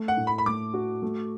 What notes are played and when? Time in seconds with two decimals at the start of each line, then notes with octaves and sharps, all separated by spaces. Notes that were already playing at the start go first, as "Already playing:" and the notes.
Already playing: A3
0.08 F#5
0.17 A2
0.27 B5
0.38 B5
0.46 A2 D6
0.74 F#4
1.02 A3